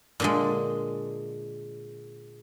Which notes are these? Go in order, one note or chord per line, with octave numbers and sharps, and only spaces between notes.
A#2 D3 G#3